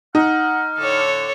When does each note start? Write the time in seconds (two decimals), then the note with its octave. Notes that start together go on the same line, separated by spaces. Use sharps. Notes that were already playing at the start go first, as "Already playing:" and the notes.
0.15 D#4 F#5 F6
0.79 A2 D3 A4 C#5